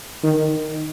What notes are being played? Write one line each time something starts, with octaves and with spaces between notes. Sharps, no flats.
D#3